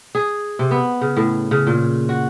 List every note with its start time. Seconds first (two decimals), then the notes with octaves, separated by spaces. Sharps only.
0.15 G#4
0.59 C3
0.71 B3
1.01 C#3
1.17 A2
1.51 C#3
1.67 A#2
2.09 F#4